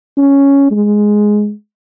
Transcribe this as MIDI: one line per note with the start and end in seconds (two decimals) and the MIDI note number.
0.17 0.67 61
0.71 1.52 56